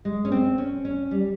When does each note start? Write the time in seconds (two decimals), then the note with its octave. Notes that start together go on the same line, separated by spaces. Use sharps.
0.05 G#3
0.25 C#4
0.32 C4
0.58 C#4
0.85 C#4
1.11 G3